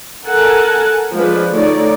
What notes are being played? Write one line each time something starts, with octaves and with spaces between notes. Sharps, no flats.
A4 A#4 F#5 G#5 A5
F3 G#3 D4 B4
D3 A3 D#4 C#5 D5